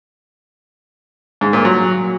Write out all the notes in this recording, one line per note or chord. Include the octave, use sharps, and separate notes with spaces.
G#2
A#2
F#3